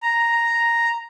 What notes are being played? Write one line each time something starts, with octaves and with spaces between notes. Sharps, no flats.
A#5